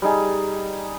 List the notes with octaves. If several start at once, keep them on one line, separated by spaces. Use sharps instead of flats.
G3 D#4 G#4